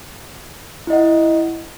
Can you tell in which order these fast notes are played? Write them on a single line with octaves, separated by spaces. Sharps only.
E4 D#5 F#5